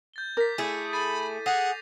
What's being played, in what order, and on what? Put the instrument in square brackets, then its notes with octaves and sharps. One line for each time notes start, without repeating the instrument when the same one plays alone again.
[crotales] G6 A6 G7
[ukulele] A#4 [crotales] D6 A6 B6
[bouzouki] A3 G#4 [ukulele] E4
[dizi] B5 [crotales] A6 C7 D#7
[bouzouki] G#4 [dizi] F#5 [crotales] A#6 C7 F7